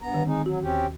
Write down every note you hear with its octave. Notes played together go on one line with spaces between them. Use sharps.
G2 B3 A#5
D3 D#3
G#3 C4 D#4
F#3 F#4
D#2 C4 C#4 G4